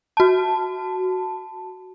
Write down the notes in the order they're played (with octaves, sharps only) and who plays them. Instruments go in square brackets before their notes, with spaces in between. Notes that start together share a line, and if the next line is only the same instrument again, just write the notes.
[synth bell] F#4 A5